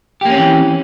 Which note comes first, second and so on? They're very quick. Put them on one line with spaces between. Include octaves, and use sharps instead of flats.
G4 A#3 C#4 C4 E3